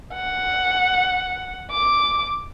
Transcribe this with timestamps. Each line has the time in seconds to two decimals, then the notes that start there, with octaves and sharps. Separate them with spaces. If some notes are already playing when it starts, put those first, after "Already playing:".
0.14 F#5
1.71 D6